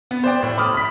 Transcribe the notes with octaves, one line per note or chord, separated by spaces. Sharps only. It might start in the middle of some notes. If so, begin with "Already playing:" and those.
B3
C5 D5 G5
A2
B5 D6 D#6 F6
B5 B6